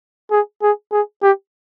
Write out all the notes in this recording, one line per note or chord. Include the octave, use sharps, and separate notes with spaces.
G#4
G#4
G#4
G4